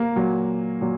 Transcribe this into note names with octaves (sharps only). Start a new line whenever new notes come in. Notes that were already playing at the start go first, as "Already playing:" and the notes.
Already playing: A#3
A#2 F#3
A#2 F#3